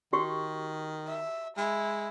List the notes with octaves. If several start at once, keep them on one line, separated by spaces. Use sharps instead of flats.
D#3 F#4 G4 C#6
E5
G#3 E4